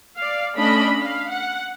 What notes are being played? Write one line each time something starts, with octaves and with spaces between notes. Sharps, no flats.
D5 F5
A3 C#4 D4 D#5 B5
F5
F#5